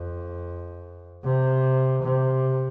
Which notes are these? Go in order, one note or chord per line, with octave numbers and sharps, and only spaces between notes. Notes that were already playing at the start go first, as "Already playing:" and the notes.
Already playing: F2
C3
C3